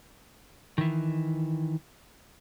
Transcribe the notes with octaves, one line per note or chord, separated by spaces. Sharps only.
D#3 E3